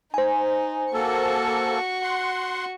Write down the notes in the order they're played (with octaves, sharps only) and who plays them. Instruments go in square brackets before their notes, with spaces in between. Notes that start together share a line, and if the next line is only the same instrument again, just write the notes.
[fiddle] D#4 [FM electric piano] C5 G#5
[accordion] A#3 A4 [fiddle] F#4 C#6
[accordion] F#5 C6